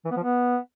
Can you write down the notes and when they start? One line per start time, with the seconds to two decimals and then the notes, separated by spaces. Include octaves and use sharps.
0.05 E3
0.11 B3
0.17 F3
0.23 B3